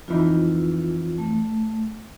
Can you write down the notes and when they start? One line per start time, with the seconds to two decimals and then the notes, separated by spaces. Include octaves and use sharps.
0.08 F2 E3 D#4 F4
1.18 A3